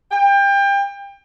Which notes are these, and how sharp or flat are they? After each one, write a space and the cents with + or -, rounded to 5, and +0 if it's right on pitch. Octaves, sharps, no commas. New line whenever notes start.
G5 +30